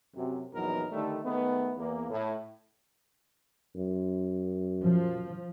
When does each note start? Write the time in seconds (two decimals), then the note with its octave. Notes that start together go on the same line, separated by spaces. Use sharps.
0.15 F#2 C3 F#3
0.53 A#1 E2 F#3 B3 D#4 A#4
0.91 D3 D#3 G3 A3
1.24 D#3 G#3 A3 B3
1.76 E2 A#3
2.09 A2
3.76 F#2
4.84 F3